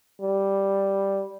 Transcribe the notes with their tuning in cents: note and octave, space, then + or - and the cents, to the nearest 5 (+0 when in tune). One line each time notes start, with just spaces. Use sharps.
G3 +0